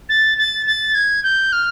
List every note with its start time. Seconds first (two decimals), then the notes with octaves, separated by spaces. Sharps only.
0.09 A6
0.38 A6
0.67 A6
0.95 G#6
1.23 G6
1.52 F6